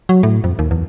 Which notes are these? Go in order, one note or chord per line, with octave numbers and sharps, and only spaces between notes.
F#3
A2
F2
D#2
E2